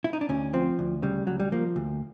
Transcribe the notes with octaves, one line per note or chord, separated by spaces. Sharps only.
E4
D#4
D4
D2 C#4
F3 C4
D2
C#3 G3
D2 F#3
G3
F3 A#3
D2